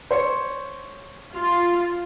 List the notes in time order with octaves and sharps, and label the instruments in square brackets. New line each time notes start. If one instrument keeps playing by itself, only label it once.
[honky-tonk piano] C5 C#5 C#7
[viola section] F4